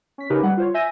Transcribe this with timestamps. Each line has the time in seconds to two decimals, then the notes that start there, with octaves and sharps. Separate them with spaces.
0.18 C#4 B6
0.30 C#3 C#4 D#4 G4 A#4 B4
0.43 G3 F#5
0.57 F4 C5 C#5
0.74 E5 G#5 G6 A#6 D#7